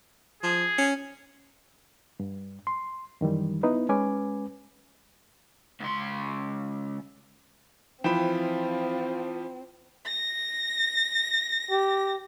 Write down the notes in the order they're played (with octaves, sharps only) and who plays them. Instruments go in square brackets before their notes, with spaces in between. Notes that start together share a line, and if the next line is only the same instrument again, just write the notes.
[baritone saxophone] F3 [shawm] G#4
[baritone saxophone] C#4
[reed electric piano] G2
C6
F#2 D#3 E3 G3
B3 D#4 E4 B4
G#3 C#4 B4 G#5 D6
[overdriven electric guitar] C#2 C6
[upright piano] E3 G5 E7 [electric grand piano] F3 B5 [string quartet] C4 [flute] F4
[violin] A#6
[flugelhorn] G4